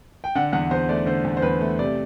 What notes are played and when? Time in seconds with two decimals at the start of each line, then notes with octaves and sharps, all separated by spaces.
0.24 G5
0.35 D3 F#5
0.53 E2 F#5
0.71 E2 C5
0.89 A3 D5
1.06 D3 C5
1.25 E2
1.37 C5
1.42 E2 B4
1.61 A3
1.79 C3 D5